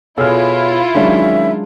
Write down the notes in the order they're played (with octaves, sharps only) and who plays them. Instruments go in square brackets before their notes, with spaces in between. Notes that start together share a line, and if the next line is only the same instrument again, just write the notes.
[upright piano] B2 G#4 E6 [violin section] E4 F4 [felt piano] A4 F6 [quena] C#5
[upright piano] D#3 C#4 [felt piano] F#3 G#3 D4 [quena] E5